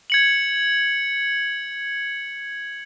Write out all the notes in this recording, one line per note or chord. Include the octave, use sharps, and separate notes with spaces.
G#6 C#7 F#7